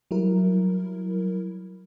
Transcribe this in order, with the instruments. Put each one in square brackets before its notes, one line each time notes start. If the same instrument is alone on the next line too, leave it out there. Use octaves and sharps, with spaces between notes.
[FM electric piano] F#3 G3 E4 A#4